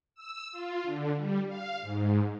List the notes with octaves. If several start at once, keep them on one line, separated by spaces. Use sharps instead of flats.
E6
F4
D3
G3
F5
G#2